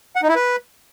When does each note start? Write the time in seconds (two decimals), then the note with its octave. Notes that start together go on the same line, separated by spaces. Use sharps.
0.16 F#5
0.22 D#4
0.29 E4
0.35 B4